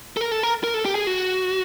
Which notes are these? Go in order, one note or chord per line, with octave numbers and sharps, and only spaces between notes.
A4
A#4
A4
A#4
A#4
A4
G4
G#4
F#4